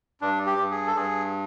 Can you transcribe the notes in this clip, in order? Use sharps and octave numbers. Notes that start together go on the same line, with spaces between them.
G2 D4
G4
G2
G#4
A4
G2 G#4